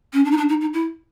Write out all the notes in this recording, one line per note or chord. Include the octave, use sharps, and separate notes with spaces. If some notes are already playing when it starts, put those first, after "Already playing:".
C#4
D4
D#4
D4
D#4
D#4
E4